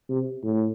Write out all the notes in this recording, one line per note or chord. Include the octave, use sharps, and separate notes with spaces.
C3
A2